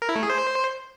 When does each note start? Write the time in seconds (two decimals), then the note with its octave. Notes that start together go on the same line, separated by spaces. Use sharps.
0.02 A#4
0.09 E4
0.16 A3
0.23 G#4
0.30 C5